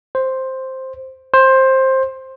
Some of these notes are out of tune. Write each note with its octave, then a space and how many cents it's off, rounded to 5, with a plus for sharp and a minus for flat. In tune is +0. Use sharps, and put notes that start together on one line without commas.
C5 +5
C5 +15